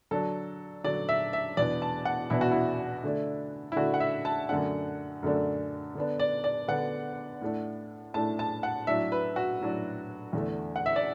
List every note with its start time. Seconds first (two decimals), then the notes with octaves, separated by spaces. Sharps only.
0.11 D3 F#3 D4 A4
0.84 D3 F#3 D4 D5
1.09 E5
1.33 E5
1.57 E2 B2 B3 D4 D5
1.82 A5
2.05 F#5
2.30 E2 B2 B3 D4 E4
2.41 F#4
2.52 E4
3.04 D3 A3 D4
3.72 E4
3.76 D3 A3 D4 F#4
3.94 F#5
4.00 E5
4.25 A5
4.49 F#2 D3 A3 D4 F#5
5.23 F#2 D3 A3 D4
5.95 D3 B3 D4
6.20 D5
6.44 D5
6.68 D3 B3 D4 F#5
7.41 A2 A3 D4
8.14 A2 A3 D4 A5
8.39 A5
8.63 F#5
8.87 A2 F#3 D4 E5
9.12 B4
9.36 F#4
9.61 A2 F#3 D4
10.33 E2 D3 A3
10.76 F#5
10.86 E5
10.96 D5